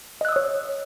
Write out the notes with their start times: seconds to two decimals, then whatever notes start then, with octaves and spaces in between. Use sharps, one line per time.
0.21 D#5
0.25 F#6
0.29 E6
0.32 D#6
0.36 C#5